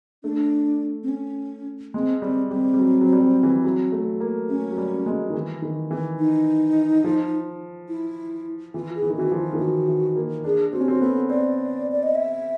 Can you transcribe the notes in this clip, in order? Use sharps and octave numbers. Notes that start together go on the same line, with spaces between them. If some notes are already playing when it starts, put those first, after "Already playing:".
A3 D4
C4
C#4
G#3 C4
G3 C4
G3 C4
G3
F#3
F#3
G3
F#3
E3
F#3
A3
A#3
A3 C#4
F#3
G3
G#3
D#3
E3
D#3
E3
D#4
F3
E4
E3 F4
G#4
E3
D#3
E3 F#4
F3
F4
D#3
E3 F#4
E3
A#3
D4 G#4
C4 F#4
C#4 G4
C4 F#4
B3 A4
C4 D5
D5
D#5
E5